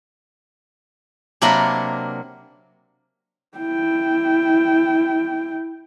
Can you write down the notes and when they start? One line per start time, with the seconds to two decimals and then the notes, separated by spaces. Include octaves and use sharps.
1.42 C3 F#3 A#3 D4 A#4 B5
3.58 E4 G5